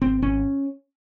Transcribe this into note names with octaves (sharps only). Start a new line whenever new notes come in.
G#1 C4
G#1 C#4